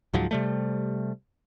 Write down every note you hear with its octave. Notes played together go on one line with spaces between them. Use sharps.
C#2 G#2 F3 F#3
C3 G3 A3